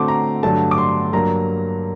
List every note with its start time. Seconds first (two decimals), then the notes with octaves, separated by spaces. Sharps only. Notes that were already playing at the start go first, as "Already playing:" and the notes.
Already playing: D3 A3 C4 F#4 C6 D6
0.08 A#5
0.43 G2 D3 F#3 A3 A5
0.71 D6
0.78 C6
1.13 G2 F#3 A#3 A#5